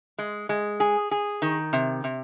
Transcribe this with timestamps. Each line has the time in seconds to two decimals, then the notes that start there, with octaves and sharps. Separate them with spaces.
0.18 G#3
0.49 G#3
0.80 G#4
1.11 G#4
1.42 D#3
1.73 C3
2.04 C3